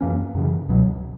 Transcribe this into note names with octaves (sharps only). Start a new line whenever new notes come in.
F#2 E3 A#3 C#4
F#2 C#3 E3
C#2 B2 F#3